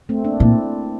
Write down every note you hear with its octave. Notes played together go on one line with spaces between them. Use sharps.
A3 C4
A#3 D4
A#2 C4 E4